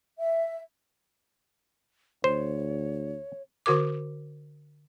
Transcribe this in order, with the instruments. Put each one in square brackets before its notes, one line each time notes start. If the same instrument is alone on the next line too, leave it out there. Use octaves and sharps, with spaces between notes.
[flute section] E5
[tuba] D2 [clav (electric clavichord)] C5 [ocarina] C#5
[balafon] D3 F#4 A#4 D6